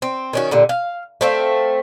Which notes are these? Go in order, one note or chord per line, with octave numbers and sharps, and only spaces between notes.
C4
D#3 C#4 F#4
A#2 D3 G3
F5
A3 C4 F5